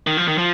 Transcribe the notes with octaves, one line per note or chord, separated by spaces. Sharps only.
D#3
F3
D#3
F3